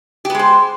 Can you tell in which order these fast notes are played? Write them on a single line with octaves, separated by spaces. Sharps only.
G4 B3 G#3 C5